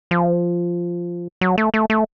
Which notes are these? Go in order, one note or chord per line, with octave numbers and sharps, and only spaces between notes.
F3
F#3
A3
A3
A3